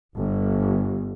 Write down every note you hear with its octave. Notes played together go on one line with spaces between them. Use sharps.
G1